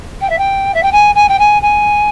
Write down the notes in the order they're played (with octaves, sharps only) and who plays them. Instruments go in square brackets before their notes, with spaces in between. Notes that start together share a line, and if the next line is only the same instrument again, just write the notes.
[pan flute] G5
E5
G5
E5
G5
G#5
G#5
G5
G#5
G#5